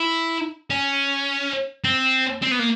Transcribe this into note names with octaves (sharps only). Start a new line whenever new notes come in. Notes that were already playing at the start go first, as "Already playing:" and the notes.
Already playing: E4
C#4
C4
C4
B3
A#3